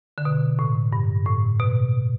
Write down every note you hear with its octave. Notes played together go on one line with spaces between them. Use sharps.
D3
B2
A2
G2
A2
B2